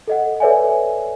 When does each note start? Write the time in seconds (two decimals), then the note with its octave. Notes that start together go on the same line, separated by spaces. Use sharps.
0.07 A4 D#5 F#5
0.40 A4 B4 C#5 D5 E5 G#5